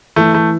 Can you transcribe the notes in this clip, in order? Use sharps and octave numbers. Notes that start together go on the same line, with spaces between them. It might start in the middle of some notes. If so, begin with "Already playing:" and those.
E3 A3
A3